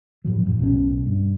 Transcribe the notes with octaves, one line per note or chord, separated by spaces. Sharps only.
A2 F3 F#3
A1 F2 A#2
B1 B2 C4 C#4
G2